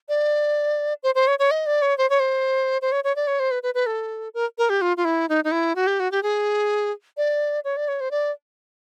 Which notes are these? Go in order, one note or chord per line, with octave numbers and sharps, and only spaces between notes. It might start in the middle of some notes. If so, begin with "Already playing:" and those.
D5
C5
C5
C#5
C#5
D#5
D5
C#5
C5
C#5
C5
C5
C#5
C#5
D5
C#5
C5
B4
B4
B4
A4
A#4
A#4
G4
F4
F4
E4
D#4
D#4
E4
F#4
G4
F#4
G4
G#4
D5
C#5
D5
C#5
C5
D5